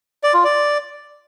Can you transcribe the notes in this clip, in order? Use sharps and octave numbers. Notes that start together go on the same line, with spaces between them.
D5
F4
D5